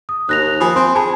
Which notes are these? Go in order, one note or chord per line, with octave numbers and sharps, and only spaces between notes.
D#6
D#2 F#6 A#6 F7
F3 G#5 B5 D#6
C4 C6
G#4 G#5 A5 B5